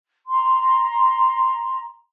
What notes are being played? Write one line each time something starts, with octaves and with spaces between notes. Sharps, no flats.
A#5 C6